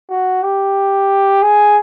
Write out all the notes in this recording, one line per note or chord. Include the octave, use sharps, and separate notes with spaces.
F#4
G4
G#4